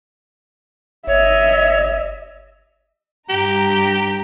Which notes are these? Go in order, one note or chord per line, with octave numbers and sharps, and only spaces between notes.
G1 C#5 D#5 E5
G2 G4 A#5